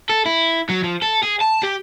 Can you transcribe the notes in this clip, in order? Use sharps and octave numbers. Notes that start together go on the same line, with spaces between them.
A4
E4
F#3
F3
A4
G#4
A5
G4